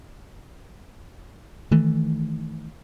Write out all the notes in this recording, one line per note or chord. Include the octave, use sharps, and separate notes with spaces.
D#3 E3 A3